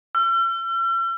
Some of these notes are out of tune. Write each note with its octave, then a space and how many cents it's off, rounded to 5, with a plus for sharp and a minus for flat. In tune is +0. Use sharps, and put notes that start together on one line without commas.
E6 +45